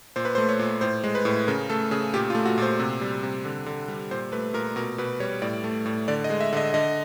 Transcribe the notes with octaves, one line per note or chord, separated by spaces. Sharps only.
A#2 C5
B4
C5
A3
C#5
A#2
A2 C5
G#3
B4
A2
C#3 A#4
A3 A4
C#3 G#4
A#2 G4
F4
A3
F#4
A#2 C5
C3
G3
C3
D3
D3
G3
A#2 C5
A3 B4
A#2 A#4
B2 A#4
B2 B4
G3 C#5
A2 D5
A3
A2
D3 D5
D#5
G#3
E5
D3 D#5
D3 D#5